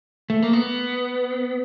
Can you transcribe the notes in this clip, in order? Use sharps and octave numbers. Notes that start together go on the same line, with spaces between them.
A3
A#3
B3